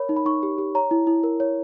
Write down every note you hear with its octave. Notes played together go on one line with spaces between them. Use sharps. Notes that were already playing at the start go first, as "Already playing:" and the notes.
Already playing: A#4 C#5 B5
D#4
B5
D#4 C#6
G4
G4
C#5 A#5
E4
E4
A#4
C#5